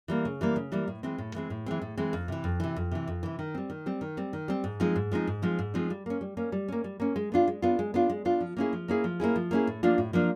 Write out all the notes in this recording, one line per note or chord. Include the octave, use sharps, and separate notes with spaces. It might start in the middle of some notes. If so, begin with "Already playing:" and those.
E3 G3 A#3
C#3
E3 G3 A#3
C#3
E3 G3 A#3
A2
E3 G#3 C4
A2
E3 G#3 C4
A2
E3 G#3 C4
A2
E3 G#3 C4
F2
C3 E3
F2
C3 E3
F2
C3 E3
F2
C3 E3
D#3
G3 C4
D#3
G3 C4
D#3
G3 C4
D#3
G3 C4
G#2
F3 G#3 C4 D#4
G#2
F3 G#3 C4 D#4
G#2
F3 G#3 C4 D#4
G#2
F3 G#3 C4 D#4
G3
A#3 C#4
G3
A#3 C#4
G3
A#3 C#4
G3
A#3 C#4
G#3
B3 D4 F4
G#3
B3 D4 F4
G#3
B3 D4 F4
G#3
B3 D4 F4
F3
A#3 C#4 E4 G#4
F3
A#3 C#4 E4 G#4
F3
A#3 C#4 E4 G#4
F3
A#3 C#4 E4 G#4
A2
F3 A#3 D4 F4
A2
F3 A#3 D4 F4